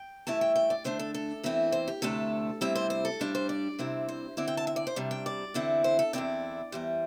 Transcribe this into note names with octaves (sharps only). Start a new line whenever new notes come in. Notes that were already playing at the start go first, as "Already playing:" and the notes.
Already playing: G5
G2 E3 A3 E4 A5
G5
G5
D5
D3 A3 D4 C5
A4
A4
E2 E3 C4 E4
C5
G4
D2 C3 A3 D4 A4
C3 G3 C4 E4 E5
C5
C5
A4
G2 G3 D4 C5
C5
D5
C3 G3 C4 E4
C5
D3 C4 E4 D5
G5
A5
E5
D5
C5
C3 G3 D4
G5
D5
E2 D3 C4 E4
C5
A4
E2 D3 C4 E4 D5
E2 E3 G3 C5